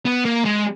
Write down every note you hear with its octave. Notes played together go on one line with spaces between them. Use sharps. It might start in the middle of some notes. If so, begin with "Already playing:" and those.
B3
A#3
G#3